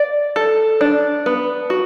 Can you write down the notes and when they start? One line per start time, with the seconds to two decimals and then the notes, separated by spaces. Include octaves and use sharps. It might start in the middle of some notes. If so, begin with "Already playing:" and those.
Already playing: D5
0.36 A4
0.81 D4
1.26 B3
1.70 F#4